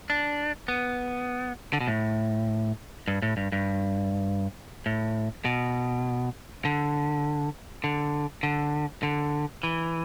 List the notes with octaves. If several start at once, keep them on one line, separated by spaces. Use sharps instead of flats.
D4
B3
D3
B2
A2
G2
A2
G2
G2
A2
B2
D3
D3
D3
D3
E3